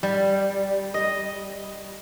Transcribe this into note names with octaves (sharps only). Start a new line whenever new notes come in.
G3
D#5